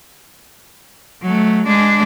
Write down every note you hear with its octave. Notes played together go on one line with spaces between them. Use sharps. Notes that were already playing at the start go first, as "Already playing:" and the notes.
F#3 A3
G#3 D4